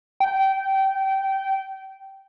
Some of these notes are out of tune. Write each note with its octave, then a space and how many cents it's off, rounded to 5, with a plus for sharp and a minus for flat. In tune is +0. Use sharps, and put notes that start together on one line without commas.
G5 -20